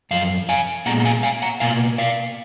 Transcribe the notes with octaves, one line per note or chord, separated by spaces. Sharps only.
F#2 F3 F5
F5 G#5
A#2 G#3 B3 F#5 A#5
A#5
F5 G#5
F5 G#5
F#5 A#5
B2 A#3 F5 G#5
D5 F5